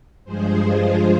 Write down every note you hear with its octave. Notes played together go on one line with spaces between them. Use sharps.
G2 F3 G#3 G#4 C5
F4 G#4